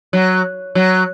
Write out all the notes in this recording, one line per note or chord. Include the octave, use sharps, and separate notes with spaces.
F#3
F#3